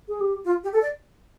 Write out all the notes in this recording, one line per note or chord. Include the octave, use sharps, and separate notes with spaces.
G#4
G4
F4
G4
A4
D5